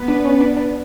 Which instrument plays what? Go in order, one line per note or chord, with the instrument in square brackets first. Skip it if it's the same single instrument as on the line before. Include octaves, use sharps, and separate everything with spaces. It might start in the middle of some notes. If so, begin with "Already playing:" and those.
Already playing: [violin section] B3 B4
[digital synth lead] D4
C#4
D4
D4